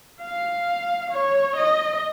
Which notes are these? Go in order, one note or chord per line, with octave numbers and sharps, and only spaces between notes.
F5
C#5
D#5